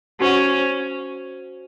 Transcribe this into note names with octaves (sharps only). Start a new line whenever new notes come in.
C#4 F#4 C5 F#5